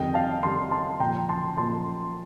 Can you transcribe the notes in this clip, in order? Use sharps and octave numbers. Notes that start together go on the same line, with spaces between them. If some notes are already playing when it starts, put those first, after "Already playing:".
Already playing: F2 D#3 G3 D#5 G5
F5 A5
F2 D#3 G3 A5 C6
A5 C6
A#2 F3 G5 A#5
A5 C6
A#2 F3 A5 C6